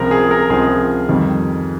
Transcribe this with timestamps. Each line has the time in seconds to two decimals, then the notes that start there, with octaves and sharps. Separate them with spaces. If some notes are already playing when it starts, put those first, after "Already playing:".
Already playing: C#2 C3 F3 A#4
0.11 G#4
0.31 A#4
0.50 C#2 C3 F3 G#4
1.09 F2 D#3 G3